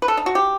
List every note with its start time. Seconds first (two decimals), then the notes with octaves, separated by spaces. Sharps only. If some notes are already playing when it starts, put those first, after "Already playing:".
0.02 B4
0.08 A4
0.17 D#4
0.26 F#4
0.35 G4